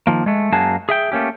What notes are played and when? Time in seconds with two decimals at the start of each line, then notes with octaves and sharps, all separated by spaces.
0.07 D#3 F3 A#3
0.26 G#3 A3
0.52 F#2 A#3 F#4 G#4 A5
0.89 G#4 E5 G5
1.12 A3 A#3 C#4 G4